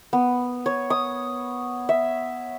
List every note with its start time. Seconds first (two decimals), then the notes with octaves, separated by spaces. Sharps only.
0.13 B3
0.66 C#5
0.90 D#6
1.89 E5